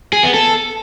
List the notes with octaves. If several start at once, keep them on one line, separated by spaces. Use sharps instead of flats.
G#4
B3
A4